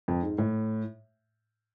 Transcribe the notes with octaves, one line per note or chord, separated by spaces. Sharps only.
F2
G#2
A2